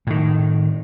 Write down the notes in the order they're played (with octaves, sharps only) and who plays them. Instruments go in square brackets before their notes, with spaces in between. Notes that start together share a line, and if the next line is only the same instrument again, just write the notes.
[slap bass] A2 D#3